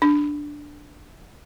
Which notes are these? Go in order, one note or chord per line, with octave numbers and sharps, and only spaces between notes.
D4